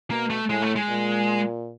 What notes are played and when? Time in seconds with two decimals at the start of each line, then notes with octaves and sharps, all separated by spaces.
0.10 B2 A#3
0.30 A3
0.49 A2 G#3
0.62 A3
0.76 G#3
0.89 A#2